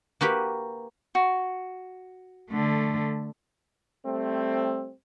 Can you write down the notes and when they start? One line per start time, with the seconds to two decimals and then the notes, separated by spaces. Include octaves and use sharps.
0.21 A#3 F#4 G4 B4
1.15 F#4
2.51 D3 A3
4.05 G3 A3 C4